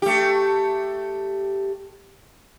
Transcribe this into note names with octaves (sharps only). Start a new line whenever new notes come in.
A3 G4